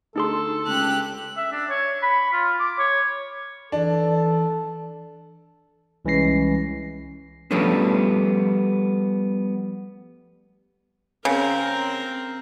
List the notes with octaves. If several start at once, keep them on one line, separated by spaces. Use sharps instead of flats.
D2 D#4 G#4 A4 C6
C#2 G4 F#6
E5
D4
C#5
B5
F4
D6
C#5
E3 D4 A4
C2 E3 G#3 C#4 A#6 C7
F3 G3 A3 B3 C#4 D4
C#3 C4 A#4